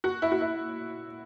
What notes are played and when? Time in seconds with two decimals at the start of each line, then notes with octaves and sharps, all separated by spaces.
0.04 F#4
0.22 E4
0.32 F#4
0.41 E4